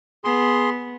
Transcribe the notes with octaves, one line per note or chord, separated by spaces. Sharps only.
B3 G#4 C6